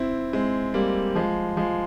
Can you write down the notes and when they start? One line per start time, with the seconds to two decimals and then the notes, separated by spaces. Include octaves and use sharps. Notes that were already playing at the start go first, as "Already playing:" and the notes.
Already playing: C4 E4
0.33 G#3 C4
0.74 G3 A#3
1.15 F3 G#3
1.57 F3 G#3